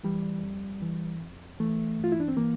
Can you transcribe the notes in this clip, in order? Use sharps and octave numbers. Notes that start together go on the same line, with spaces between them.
E3 G3
F2
E3
F2
E3 A3
G2
F4
E4
D4
C4
E3 A#3